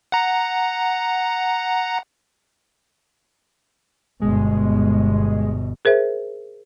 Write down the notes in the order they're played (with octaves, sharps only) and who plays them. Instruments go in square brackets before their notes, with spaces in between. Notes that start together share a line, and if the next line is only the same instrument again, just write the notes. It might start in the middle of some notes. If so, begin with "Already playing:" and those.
[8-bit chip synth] F#5 A#5
[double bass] G1 B2 [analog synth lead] G#3
[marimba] G#4 A#4 C5 E5